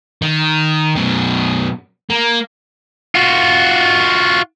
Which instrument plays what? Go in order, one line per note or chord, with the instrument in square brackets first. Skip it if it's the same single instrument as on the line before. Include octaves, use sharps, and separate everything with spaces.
[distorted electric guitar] D#3
F#2 B2
A#3
F4 F#4